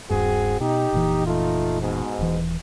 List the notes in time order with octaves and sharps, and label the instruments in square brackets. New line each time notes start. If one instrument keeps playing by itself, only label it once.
[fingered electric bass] D#1 G2 [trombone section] C4 F#4 G#4
[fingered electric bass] B2 [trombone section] D#4 G4
[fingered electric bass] F1 A#2 E3
[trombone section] A3 D#4 F4
G#2 B2
[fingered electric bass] D#1 E3